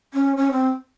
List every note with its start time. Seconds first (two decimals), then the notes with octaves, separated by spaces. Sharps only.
0.14 C#4
0.37 C#4
0.52 C4